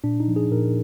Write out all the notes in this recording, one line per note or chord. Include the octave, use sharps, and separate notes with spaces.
A#2 D4
D#4
F3
G#4
A#2 A#4